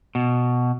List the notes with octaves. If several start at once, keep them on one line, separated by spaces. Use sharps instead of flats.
B2